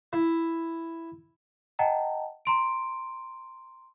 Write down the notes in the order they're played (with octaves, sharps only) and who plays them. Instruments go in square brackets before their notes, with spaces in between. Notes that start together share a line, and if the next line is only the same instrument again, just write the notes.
[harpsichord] E4
[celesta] D#5 F#5 G5 A5 A#5
A#5 C6 D7